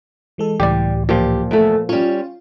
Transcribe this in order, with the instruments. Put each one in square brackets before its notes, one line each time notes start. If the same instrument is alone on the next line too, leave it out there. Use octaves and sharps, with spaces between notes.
[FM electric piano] E3 G#3 A4
[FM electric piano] C#2 A2 E3 [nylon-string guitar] G3 [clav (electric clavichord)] G4 D5
[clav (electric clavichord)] A#2 F3 [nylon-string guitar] G4
[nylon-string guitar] E2 A3
[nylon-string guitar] G3 C#4 [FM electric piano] F4 F5